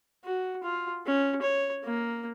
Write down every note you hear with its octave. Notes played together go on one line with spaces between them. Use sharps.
F#4
F4
C#4
C#5
A#3